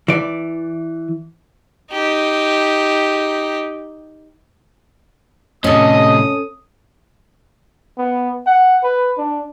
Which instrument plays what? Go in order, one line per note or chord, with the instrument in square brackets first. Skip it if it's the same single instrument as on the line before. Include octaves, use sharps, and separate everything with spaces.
[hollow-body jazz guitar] E3 D5
[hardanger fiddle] D#4 G4
[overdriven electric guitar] A2 C3 [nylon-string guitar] C#4 A4 [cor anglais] D#5 [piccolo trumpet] D#6
[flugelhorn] B3
F#5
B4
D4